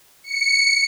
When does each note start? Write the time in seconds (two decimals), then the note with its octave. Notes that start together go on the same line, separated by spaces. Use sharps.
0.24 C#7